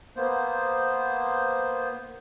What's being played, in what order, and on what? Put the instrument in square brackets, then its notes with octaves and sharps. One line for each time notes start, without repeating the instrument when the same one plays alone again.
[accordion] A#3 B3 C5